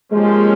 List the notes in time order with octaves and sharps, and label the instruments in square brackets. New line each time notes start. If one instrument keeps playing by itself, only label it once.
[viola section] F3 A#3 C#4 G4 [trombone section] G#3